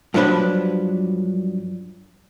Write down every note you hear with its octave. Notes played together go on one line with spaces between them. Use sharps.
G2 F3 F#3 D4 B4